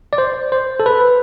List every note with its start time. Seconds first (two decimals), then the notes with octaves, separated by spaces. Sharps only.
0.13 D5
0.18 C5
0.52 C5
0.80 A4
0.86 B4